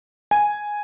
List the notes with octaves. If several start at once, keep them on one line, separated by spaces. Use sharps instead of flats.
G#5